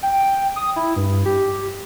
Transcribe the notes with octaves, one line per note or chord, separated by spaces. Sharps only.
G5
D#6
E4
G2
G4